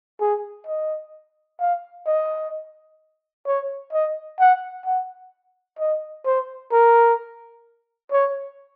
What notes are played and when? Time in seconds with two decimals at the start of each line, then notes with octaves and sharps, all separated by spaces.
0.20 G#4
0.67 D#5
1.60 F5
2.06 D#5
3.47 C#5
3.93 D#5
4.40 F#5
4.86 F#5
5.79 D#5
6.25 C5
6.72 A#4
8.12 C#5